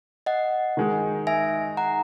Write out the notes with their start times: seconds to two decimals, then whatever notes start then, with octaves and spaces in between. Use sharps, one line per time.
0.26 D#5 F#5
0.77 D#3 G#3 D#4 G#4
1.27 E5 G#5
1.77 F#5 A#5